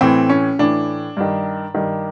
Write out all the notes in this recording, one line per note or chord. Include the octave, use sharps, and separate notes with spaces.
A2 E3 C4
C#4
A2 E3 D4
G2 D#3
G2 D#3